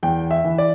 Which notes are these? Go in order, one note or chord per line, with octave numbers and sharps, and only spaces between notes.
E2 G5
E5
E3
D5